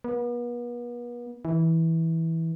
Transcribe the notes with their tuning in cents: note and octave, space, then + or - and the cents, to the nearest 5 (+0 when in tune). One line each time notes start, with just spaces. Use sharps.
B3 -40
E3 -15